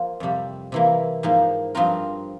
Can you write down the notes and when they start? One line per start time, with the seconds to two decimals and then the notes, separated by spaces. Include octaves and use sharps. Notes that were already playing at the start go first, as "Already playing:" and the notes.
Already playing: F3 A#3 F4
0.20 F2 C3 G3
0.72 C3 E3 A#3
1.23 G#2 F3 A#3
1.75 G2 F3 C4 F4 A#4